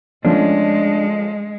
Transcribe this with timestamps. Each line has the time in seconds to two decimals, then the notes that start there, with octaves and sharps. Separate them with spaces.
0.25 F3 G#3 A3 C#4 D4